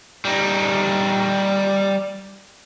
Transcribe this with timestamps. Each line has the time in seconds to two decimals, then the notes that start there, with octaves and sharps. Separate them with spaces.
0.25 G3 D#4